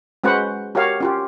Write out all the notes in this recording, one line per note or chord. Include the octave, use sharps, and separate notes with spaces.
G#3 C#4 F#4 B4 C5 F#5
F#4 G4 A#4 C#5 F5
C#4 F4 G4